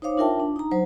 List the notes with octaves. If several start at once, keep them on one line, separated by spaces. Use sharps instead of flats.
D#4 C5 C#5 F5 D6
D4 F4 A#4 E5 G5 A5
D4
D#4 A#5
F#3 C5